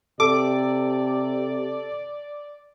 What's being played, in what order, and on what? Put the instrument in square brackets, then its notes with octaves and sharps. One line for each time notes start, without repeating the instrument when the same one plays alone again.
[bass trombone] C3 [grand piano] A4 [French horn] D5 [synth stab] D6